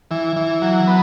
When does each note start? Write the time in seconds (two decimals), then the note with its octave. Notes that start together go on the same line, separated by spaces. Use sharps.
0.11 E3
0.36 E3
0.62 F#3
0.87 B3